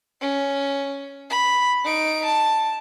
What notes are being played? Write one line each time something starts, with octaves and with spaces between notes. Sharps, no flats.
C#4
B5
D#4 D7
A5